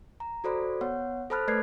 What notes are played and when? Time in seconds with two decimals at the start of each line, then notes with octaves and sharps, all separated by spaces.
0.20 A#5
0.44 F#4 A4 C5 D5 B5
0.81 B3 C#5 F#5
1.30 A4 C5 A5 B5 F6 F#6
1.48 A3 A4 B4 D5 G#6 C7